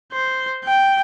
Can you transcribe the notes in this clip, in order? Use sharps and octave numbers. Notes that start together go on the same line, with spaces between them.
C5
G5